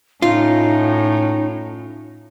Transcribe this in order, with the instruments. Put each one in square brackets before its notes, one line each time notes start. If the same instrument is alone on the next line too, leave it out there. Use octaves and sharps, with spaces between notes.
[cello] A2 [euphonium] C#4 [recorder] D#4 [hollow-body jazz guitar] F4